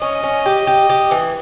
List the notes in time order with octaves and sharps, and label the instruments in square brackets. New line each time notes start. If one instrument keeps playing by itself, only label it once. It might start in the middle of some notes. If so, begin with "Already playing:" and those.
[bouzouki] C#4 [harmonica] D#5
[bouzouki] C#4
G4
G4
G4
E3